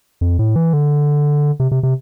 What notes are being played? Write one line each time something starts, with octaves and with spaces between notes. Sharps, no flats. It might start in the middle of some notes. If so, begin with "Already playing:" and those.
F2
A2
E3
D3
C3
C3
C3